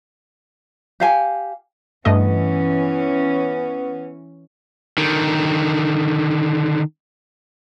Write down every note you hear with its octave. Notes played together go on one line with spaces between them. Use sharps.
G4 F5 G#5
G2 E3 A3 B3 C#4 D#5
D3 D#3